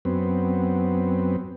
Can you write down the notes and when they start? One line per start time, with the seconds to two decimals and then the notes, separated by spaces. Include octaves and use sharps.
0.05 F#2 B3 C4